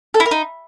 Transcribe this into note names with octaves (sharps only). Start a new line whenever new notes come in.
A4
E4
A#4
D#4